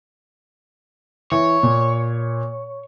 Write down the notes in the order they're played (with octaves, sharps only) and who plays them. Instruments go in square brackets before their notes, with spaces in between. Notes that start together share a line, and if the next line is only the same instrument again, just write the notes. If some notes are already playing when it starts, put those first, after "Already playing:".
[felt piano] E3 [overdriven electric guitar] C#5
[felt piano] A#2